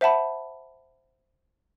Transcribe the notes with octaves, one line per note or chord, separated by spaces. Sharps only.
C5 E5 F#5 A5 B5